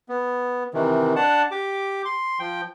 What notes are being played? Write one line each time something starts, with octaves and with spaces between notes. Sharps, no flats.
B3
C3 D#3 E3
D4 F#5 A5
G4 D6
C6
F3 G5